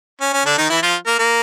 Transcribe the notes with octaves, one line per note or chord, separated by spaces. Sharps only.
C#4
C#4
D3 D4
D#3 D#4
E3 E4
F3 F4
A#3 A#4
A#3 A#4